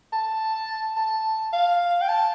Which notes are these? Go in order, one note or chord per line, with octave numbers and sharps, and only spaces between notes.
A5
A5
F5
G5
A5